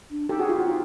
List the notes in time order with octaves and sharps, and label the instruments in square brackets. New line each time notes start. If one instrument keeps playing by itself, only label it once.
[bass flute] D4
[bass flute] D#4 [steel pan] G4 A4
[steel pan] F#4 G#4
F4 G4
F#4
F4 G4